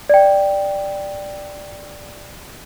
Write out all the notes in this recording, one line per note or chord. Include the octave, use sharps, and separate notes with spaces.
D5 G5